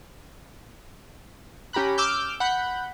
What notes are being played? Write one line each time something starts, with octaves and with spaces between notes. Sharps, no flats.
C#4 G4 A#5 B5 F#6
D6 E6 F6 G6
F#5 B5 G6